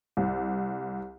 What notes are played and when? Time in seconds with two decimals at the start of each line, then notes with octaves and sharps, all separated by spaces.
0.17 C2